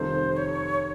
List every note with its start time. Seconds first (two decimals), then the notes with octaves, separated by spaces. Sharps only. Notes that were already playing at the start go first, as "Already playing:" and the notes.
Already playing: F1 F2 D#3 G3 C5
0.37 C#5